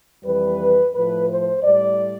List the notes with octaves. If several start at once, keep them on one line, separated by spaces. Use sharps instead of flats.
F2 E3 G3 B4
A2 F3 B4
C5
A2 G3 D5